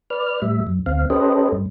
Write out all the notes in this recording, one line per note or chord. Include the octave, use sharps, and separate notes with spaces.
B4 D5 F6
A2 G3 E5
F#2
D2 C4 F5
C#4 G4 A4 B4 C5 D#5
G2